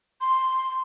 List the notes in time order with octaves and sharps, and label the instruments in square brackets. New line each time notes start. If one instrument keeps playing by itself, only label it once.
[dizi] C6